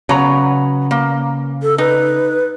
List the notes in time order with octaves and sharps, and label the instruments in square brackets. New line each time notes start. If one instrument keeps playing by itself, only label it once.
[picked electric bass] C#3 [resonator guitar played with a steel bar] F#3 B3 A#5
[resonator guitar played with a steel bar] A#3
[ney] A4
[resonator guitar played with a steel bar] D#4 [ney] B4